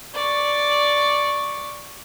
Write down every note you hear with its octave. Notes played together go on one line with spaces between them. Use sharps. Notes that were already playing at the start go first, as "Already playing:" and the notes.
D5 C#6